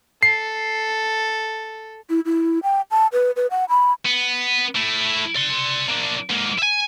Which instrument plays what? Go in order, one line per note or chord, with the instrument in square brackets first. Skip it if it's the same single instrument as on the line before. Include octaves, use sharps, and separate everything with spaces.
[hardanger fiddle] A4 [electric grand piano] C7
[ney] E4
E4
G5
A5
B4
B4
F#5
B5
[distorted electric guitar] B3
A3 E4
D5 C6
A#3 D4
G#2 A#3
E5 G#5